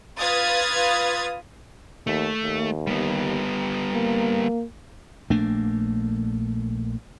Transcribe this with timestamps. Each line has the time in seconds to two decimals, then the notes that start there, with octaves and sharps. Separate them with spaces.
0.19 F4 B4 F5 D#6 G#6 A6
2.07 D#2 A3
2.43 D#2
2.87 G3 B3
3.94 A#3
5.30 A#1 A3 A#3 D4